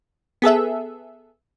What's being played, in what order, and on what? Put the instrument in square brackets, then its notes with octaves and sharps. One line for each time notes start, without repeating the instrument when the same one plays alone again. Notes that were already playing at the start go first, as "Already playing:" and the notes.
[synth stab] B3 G#4 A4 E5